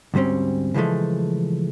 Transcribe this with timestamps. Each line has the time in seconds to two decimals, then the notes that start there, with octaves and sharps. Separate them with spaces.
0.14 D2 G#2 G3 C4 C#4
0.74 C#3 E3 F3 G#3 A3